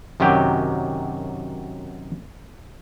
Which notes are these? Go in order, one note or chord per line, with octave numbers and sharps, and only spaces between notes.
F#2 C3 D#3 F#3 G4